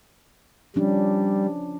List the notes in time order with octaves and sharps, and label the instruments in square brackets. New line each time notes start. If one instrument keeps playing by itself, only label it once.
[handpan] F3 C#4 D4 [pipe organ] G3